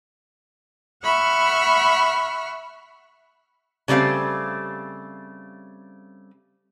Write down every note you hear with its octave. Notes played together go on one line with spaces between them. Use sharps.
E5 F#5 B5 C#6 F6
C#3 G3 A3 C4 F5